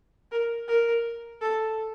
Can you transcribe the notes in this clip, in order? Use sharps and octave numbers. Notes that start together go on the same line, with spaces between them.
A#4
A#4
A4